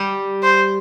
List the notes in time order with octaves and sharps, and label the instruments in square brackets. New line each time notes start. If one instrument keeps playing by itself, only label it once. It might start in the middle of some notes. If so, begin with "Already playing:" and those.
Already playing: [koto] G3 G4
[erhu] C5